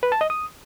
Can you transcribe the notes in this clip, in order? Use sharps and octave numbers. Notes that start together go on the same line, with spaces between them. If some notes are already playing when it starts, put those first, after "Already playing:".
B4
A5
D#5
D#6